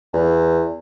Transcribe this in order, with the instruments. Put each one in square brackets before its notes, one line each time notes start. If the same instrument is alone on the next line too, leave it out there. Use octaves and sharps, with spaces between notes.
[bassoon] E2